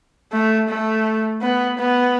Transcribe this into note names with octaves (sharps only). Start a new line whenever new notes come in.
A3
A3
B3
B3